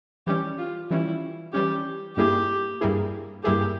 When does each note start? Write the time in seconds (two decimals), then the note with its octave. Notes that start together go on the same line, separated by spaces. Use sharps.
0.27 E3 G3 C#4 G4
0.58 F4
0.91 E3 G3 C#4 E4
1.53 E3 G3 C#4 G4
2.16 G2 G3 A#3 E4 G4 G#4
2.81 G2 G3 A#3 E4 G#4
3.43 G2 G3 A#3 E4 G4 G#4